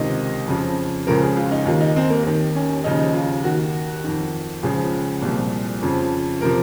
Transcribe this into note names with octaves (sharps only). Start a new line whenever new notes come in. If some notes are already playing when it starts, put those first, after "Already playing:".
Already playing: C#2 C3 D#3 D#5
F2 C#3 F3
C#2 C#3 F3 A#4
G#4
F4
D#4
D#2 D#3 F4
D#4
C4
A#3
D#2 D#3
C#4
D#2 C#3 F3 D#4
F4
D#2 D#3 F#4
F2 D#3
C#2 C#3 F3 G#4
C2 A#2 F3
F2 C#3 F3
C3 F3 A#4